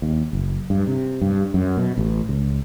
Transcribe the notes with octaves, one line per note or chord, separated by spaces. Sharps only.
D#2
F#1
G2
C3
G2
F#2
B2
A1
C#2